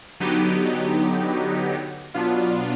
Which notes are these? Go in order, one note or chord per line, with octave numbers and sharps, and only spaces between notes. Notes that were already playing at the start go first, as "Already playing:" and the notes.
D3 F#3 B3 D#4 G4
B2 F#3 B3 D4 F4